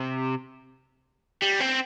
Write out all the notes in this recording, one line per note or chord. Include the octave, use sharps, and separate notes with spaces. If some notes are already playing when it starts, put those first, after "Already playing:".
Already playing: C3
G3
C4